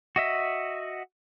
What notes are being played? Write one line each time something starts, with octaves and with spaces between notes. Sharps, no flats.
F#4 D#5 E5